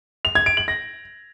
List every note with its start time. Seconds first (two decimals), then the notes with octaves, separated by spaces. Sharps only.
0.25 F7
0.35 G#6
0.46 D7
0.57 F#7
0.68 A#6